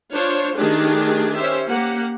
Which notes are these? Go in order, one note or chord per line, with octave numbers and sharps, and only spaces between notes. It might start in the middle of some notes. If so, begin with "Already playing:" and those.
D4 F4 C5 C#5
D#3 A3 D4 G4 G#4
C#4 G4 C5 E5
A#3 G4 F#5